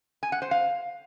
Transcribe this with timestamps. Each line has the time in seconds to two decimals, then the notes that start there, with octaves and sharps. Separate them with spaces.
0.23 G#5
0.32 F#5
0.42 C5
0.51 F5